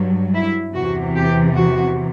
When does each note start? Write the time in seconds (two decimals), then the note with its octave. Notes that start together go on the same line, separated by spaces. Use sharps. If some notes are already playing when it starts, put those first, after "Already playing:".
Already playing: G2 F#3
0.34 E4
0.75 E2 C3 E3 F#4
1.16 G4
1.57 F#4